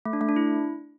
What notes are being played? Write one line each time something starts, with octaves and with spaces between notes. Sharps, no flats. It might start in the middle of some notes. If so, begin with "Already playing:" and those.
A3
D4
A3
D4
E4